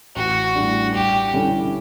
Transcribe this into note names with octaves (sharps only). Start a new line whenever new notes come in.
A1 F#4
A2 G3 D4
G2 G4
D3 G3 C#4 E4